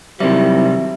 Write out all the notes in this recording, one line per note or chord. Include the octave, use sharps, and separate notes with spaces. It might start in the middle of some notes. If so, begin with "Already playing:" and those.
C3 D#3 F#3 G3 C4 E4 E5